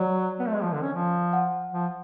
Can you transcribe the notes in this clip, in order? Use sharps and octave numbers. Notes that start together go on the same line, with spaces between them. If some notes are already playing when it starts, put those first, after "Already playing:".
Already playing: F#3 D5
B3
A3
G#3
F3
D3
C#4
F3
F#5
F3